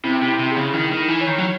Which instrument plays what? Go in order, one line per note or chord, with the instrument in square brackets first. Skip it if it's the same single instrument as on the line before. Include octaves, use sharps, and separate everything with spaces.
[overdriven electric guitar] C3 [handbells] E4
[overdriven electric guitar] C3
[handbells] E4
[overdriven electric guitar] C3
[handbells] G#4
[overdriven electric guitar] C#3
[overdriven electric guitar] D#3 [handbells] E4
[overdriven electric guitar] D#3
[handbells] E4
[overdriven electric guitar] E3
[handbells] C#5
[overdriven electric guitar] D#3
F#3